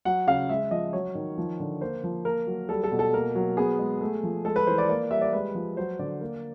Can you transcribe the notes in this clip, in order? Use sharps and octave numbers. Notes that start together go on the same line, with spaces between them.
F#3 F#5
C#3 F5
G#3 E5
F3 D#5
F#3 C#5
D#3
F3
D3
A#3 C5
F3
A#3 A#4
F#3
G3 A4
A4
B2
A4
A#3 A#4
F#3
B3 G#4
G#3
A3
F3
G#3 A4
B4
E3 C5
D5
A#3 D5
G3 E5
D5
G#3 B4
F3
F#3 C5
D3 D5
A#3